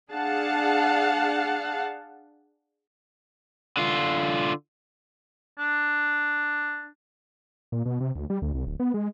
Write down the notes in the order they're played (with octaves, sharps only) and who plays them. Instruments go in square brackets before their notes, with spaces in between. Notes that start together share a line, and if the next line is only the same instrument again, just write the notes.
[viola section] D4 G#4 F5 F#5 A5
[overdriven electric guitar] D3 F4
[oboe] D4
[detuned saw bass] A#2
B2
C3
D2
G3
D2
C2
D1
B3
G#3